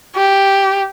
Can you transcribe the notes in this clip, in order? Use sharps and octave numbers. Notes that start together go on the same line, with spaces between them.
G4